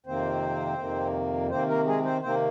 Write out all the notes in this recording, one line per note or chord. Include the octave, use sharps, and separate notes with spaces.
F2 C3 D#3 A#3 C4 C5
F2 C3 D#3 A#3
C3 D#3 A#3 C4 C5
A#3 A#4
G#3 G#4
C4 C5
C3 D#3 A#3 C4 C5